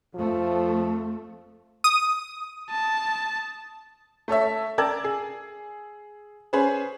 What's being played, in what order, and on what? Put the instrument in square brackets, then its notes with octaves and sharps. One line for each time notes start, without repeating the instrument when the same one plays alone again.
[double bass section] F2 A3 [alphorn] F3
[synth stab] D#6
[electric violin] A5
[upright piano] A3 A4 C#5 E5
A#4 D5 G5 A5 E6 G#6
G#4
C#4 G#4 B4 C5